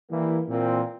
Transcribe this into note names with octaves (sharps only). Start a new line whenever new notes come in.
E3 G3 A#3
A#2 E3 C4